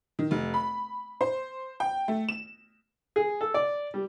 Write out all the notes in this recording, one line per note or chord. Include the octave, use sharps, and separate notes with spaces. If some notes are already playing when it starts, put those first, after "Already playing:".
D#3
F1
B5
C5
G5
A3
E7
G#4
A4
D5
G3